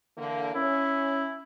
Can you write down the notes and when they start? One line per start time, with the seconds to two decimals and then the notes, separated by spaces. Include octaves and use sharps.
0.17 D3 E3 A#3
0.55 C#4 E4